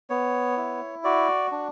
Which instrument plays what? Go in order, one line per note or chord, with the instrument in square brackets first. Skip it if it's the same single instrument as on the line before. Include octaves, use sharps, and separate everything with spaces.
[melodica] B3 C#5
E4
F#4 D5
D4